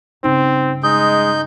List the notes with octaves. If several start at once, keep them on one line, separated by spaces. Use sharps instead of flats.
G2 C#3 C4 D#4
G#3 D#4 D#6 G6